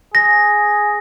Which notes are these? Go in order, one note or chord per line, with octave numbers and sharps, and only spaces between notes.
G#4 A#6